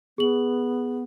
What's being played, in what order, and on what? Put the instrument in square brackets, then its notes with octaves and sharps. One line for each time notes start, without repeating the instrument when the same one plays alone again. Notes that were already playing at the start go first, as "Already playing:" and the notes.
[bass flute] B3 [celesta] G#4 F#7